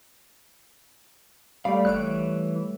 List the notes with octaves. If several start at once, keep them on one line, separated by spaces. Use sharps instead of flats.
G3 A3 D5 F5 B5
G1 E3 C#5 C#6 F#6 D7